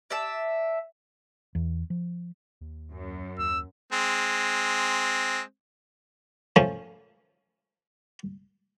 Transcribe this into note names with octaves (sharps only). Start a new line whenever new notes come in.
D5 E5 A5
E2
F3
D#2
F#2
D#2 E6
G#3 C4
F3 A3 C#4